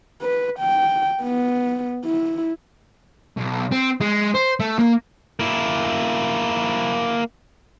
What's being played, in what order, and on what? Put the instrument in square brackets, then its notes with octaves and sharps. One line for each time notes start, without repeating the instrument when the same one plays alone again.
[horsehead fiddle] B4
G5
B3
E4
[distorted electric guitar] B1
C4
G#3
C5
A3
A#3
[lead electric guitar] A#3 E4